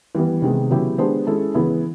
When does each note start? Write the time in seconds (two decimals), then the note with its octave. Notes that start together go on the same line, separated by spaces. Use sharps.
0.15 E3 G3 B3
0.42 C3 D#3 G#3 B3
0.70 C#3 F#3 B3 E4 G4
0.98 G#3 B3 D4 G4 C5
1.27 G#3 C#4 E4 A4
1.55 C#3 E3 G#3 B3 E4